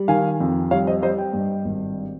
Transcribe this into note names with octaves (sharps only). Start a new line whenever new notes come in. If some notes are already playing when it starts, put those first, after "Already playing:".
Already playing: G3
D#3 F5 G#5
F2
G3 C#5 F5
C5 D#5
G3 C5 D#5
D#5 G5
G2
G#1